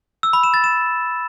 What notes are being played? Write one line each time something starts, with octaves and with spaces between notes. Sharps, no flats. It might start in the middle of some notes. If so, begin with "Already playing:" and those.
E6
B5
E7
A6
E7